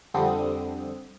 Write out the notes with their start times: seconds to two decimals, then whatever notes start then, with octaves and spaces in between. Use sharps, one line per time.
0.14 F2 D3 G3 C4 D#6